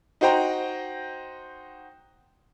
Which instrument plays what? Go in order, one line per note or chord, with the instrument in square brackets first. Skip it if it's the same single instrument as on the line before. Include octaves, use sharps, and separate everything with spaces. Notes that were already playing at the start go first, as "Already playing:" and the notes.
[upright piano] D#4 F#4 C5 G5 A#5